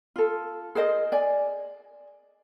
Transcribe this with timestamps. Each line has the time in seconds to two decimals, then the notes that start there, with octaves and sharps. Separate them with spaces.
0.16 F4 A4
0.75 G#4 A#4 C5 D#5
1.12 D5 G#5